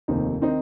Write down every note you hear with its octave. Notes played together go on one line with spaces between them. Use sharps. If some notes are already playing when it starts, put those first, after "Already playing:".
F1 D#2 D#3 C4 D#4
D#3 C4 D#4